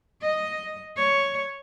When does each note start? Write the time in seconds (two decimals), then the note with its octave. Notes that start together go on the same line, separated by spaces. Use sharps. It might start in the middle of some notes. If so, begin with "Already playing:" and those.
0.21 D#5
0.96 C#5